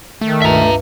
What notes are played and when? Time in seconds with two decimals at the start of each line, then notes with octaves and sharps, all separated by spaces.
0.21 D#3 A3
0.42 C#2 G2 E5 A#5